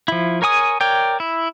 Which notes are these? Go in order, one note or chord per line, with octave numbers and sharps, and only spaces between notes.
F3 E4
A#4 C#5 G#5 D#6
A#4 C#5 D5 G5
E4